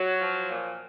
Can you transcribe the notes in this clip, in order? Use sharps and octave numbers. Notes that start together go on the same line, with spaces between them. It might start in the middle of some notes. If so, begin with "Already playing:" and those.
Already playing: F#3
F3
A#2